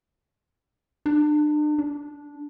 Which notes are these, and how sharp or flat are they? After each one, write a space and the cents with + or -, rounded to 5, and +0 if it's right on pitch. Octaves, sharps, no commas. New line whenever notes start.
D4 +35
D4 -10